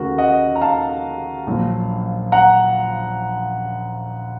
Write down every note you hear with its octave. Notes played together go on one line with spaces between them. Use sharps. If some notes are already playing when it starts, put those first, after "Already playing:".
Already playing: D#2 C#3 A3 F#4 A#4
D#5 F#5
A#5
F5 A5
A#1 A#2 F#3
F#5 A#5